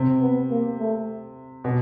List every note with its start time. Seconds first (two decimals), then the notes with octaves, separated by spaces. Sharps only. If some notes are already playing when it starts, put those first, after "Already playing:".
Already playing: C3
0.21 B3
0.50 A#3
0.79 A3
1.64 B2